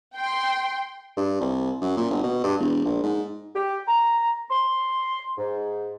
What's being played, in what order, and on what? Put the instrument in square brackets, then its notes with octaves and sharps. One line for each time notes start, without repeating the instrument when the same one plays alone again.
[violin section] G5 C6
[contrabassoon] G2
C2
F#2
A#2
G1
B2
G2
E1
A#1
G#2
[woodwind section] G4
A#5
C6
G#2